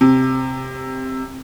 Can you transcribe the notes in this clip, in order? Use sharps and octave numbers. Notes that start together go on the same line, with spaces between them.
C3